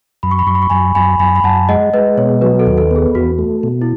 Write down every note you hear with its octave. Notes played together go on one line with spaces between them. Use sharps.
F#2 B5
C#6
B5
F#2 C#6
B5
C#6
F#2 G#5 B5
F#2 G#5 B5
F#2 G#5 B5
B5
F#2 F#5 A5
G#3 D#5 F#5
G#3 B4 D#5
B2 C#5
F#3 B4
A4
D#2
A4
B3 G#4
E2 F#4
A3
B2
E4